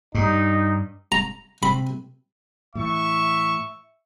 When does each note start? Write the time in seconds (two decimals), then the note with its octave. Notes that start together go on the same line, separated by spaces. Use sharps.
0.15 G2 D#4
1.12 A#5
1.63 C3 B5
2.75 A2 E3 E5 C#6